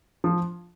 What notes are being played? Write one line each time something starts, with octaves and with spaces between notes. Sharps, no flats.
F3